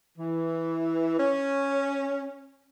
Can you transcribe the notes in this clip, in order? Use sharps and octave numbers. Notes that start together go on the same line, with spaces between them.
E3
C#4